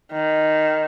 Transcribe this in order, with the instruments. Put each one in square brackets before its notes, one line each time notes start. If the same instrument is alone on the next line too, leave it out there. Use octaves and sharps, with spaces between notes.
[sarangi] D#3